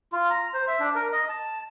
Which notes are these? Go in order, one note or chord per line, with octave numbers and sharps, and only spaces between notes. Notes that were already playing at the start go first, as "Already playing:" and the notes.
F4
A#5
C5
E5
D4
A#4
D#5
A5